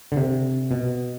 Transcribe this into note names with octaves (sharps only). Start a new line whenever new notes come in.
D3
C3
B2